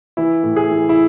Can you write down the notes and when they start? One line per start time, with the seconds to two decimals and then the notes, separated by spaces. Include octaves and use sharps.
0.17 E3 E4
0.43 A2
0.56 G#4
0.71 E3
0.89 E4